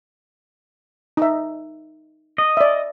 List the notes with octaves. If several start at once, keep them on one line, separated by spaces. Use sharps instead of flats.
D#4 E5
D#5
D5 E5